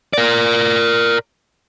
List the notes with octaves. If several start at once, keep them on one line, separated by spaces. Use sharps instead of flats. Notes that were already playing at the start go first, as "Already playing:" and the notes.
A#4 D5